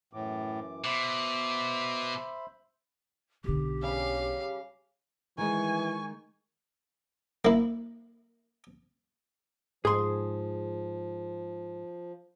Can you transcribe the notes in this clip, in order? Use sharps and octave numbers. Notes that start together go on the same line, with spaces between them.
F#2 A2 E3 D6
B2 C5 E5 B5 D6
B1 D3 G4
C#3 G3 F5
D#3 E3 G#3 G#5 C#6
A#3 E4
G#2 F3 G#4 C6